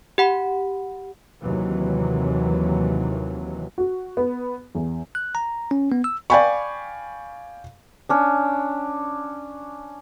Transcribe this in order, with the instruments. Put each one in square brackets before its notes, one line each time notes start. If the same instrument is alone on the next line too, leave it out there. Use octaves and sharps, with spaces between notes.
[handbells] G4 F#5 B5
[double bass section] D#2 C3 D#3 E3 F#3
[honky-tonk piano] F#4
B3
E2
[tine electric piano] F#6
A#5
C#4
B3
E6
[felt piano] D5 F5 G5 G#5 B5 C#6
[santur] C#4 D4